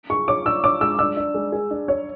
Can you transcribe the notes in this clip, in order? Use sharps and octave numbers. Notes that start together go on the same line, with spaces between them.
G#4 C#6
C#5 D6
D4 E6
C#5 D6
G#3 E6
D4 E6
D4
G#3
G#4
D4
C#5